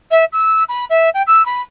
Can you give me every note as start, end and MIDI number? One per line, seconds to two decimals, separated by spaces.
0.10 0.24 76
0.32 0.63 88
0.68 0.85 83
0.89 1.09 76
1.14 1.22 79
1.26 1.44 88
1.45 1.60 83